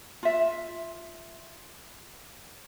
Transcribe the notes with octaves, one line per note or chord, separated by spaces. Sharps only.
F4 E5